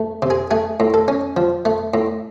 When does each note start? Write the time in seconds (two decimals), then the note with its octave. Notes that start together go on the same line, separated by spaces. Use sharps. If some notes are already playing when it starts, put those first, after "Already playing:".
Already playing: A3
0.22 C3
0.30 G#4
0.51 A3 G#4
0.80 A2
0.94 A4
1.08 C#4
1.37 F3
1.65 A3
1.94 A2